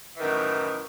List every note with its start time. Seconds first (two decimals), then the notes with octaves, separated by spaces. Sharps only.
0.14 E3
0.18 D#3
0.22 F#2
0.25 A2